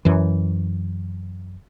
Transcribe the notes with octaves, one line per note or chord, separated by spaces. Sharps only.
F#2 E3